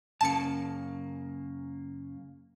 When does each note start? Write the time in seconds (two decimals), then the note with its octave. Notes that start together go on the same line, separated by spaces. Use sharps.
0.21 F#2 C#3 A#3 A5 C#7